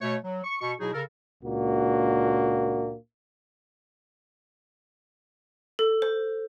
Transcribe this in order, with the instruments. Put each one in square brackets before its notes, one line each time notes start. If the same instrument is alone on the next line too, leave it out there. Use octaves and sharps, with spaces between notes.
[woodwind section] B2 A3 C#5
F#3
C#6
B2 C#6
B2 F#3 D#4 E4 F#4 G#4
C#3 A4 A#4
[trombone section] C#2 A#2 A#3 D4 F#4
[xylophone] A4
C5